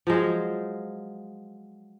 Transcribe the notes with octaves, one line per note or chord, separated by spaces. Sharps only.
F3 F#3 G#3 C5